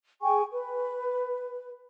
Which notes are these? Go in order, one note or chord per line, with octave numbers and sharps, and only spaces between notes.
G#4 G5 G#5 C#6
B4